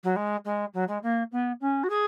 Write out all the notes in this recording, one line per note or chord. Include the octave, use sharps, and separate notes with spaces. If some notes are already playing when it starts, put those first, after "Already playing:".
F#3
G#3
G#3
F#3
G#3
A#3
B3
C#4
F#4
G#4